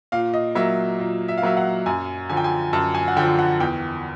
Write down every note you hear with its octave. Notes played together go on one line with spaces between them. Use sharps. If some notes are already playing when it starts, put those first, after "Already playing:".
A#2 F5
D#5
F#3 A#3 E5
A#2
E5
F5
F#3 A#3 E5
F#5
F#2 G#5
D3 F3 G#5
G5
G#5
F#2 A5
G#5
F#5
D3 F3 G5
F#5
E2 G5